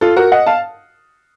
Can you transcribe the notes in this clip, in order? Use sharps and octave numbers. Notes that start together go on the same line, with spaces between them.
F4 A4
F#4 A#4
D#5 F#5
F5 A5